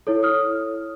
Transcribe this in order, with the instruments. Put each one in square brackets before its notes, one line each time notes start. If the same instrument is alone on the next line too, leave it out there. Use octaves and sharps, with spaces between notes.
[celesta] E4 A4 C#5
D#6 F6